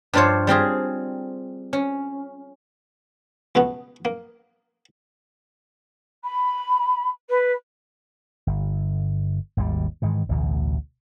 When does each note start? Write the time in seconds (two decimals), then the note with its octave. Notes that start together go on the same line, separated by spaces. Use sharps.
0.13 G2 F3 D4 F4 C5 C#5
0.47 G3 C4 F4 G#4
1.73 C#4
3.55 C#2 B2 A3 B3
4.05 A#3
6.23 B5
7.29 B4
8.47 G1
9.57 G#1 D#2 C#3 G3
10.02 G#2 D#3 E3
10.29 A1 D2 B2